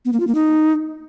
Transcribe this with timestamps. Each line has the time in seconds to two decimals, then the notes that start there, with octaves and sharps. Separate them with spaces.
0.05 B3
0.13 A#3
0.20 F4
0.27 A#3
0.35 D#4